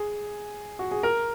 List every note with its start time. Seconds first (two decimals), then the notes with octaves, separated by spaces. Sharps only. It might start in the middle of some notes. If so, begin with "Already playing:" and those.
Already playing: G#4
0.79 F#4
0.91 G#4
1.03 A#4